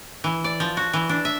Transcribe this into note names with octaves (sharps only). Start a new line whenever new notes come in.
E3
D5
F3
F#4
E3
D4
E5